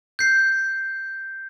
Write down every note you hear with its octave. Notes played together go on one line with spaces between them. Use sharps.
G6 C7